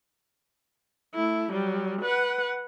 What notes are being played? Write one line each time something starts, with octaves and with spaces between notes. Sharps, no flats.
A3 E4
F#3 G3
B4 F#5